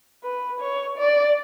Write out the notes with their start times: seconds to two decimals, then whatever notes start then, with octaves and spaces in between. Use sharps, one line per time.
0.24 B4
0.61 C#5
0.98 D5